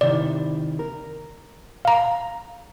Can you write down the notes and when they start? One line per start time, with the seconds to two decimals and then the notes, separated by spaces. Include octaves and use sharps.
0.01 C3 D#3 E4 D5
0.79 A#4
1.85 F5 A#5